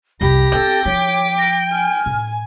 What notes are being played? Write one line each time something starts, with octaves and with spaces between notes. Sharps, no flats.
C2 F2 G4 B5 A#6
C4 A4 G5
F3 C#5 D6 B6
A#6
G#5 F6
A2